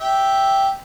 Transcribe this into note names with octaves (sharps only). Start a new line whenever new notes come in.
G4 E5 G5